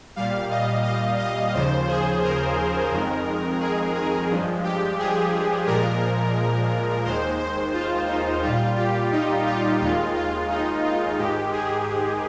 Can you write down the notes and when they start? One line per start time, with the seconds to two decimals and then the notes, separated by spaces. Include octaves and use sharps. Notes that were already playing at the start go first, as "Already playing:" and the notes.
0.16 A#2 G3 F5
0.51 D#5
0.84 D#5
1.19 D#5
1.54 D#2 C#3 F3 C5
1.88 G#4
2.23 A#4
2.92 F2 D#3 G#3
3.60 G#4
3.95 G#4
4.30 G2 F3 G#3
4.64 G4
4.99 G#4
5.67 A#2 F3 G#3 A#4
7.05 D#2 D#3 G#3 C5
7.40 C5
7.74 F4
8.09 D#4
8.43 A#2 G3 F4
8.77 G4
9.12 D#4
9.46 F4
9.80 D#2 D#3 G#3 F4
10.15 F4
10.50 D#4
10.84 F4
11.19 G#2 D#3 G#3 G4
11.53 G#4